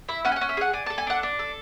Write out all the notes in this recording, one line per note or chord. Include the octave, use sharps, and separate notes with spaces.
E4 E5
C#4 F#5
G#5
F#5
C#4
E5
G#4 F#5
D4 G#5
A5
A4
G#5
D4 F#5
D4
A4